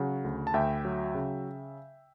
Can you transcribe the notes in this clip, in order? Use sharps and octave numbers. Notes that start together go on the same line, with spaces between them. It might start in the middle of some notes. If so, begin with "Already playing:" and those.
Already playing: C#3 F#3 F#5
D2
A5
D2 E5 G5
F#3
C#3